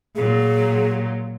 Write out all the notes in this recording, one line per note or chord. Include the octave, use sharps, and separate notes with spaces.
A#2 F#3 G#4